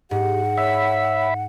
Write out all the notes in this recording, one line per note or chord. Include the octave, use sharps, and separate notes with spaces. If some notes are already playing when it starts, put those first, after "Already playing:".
G#2 G4 F#5
C#5 E5 B5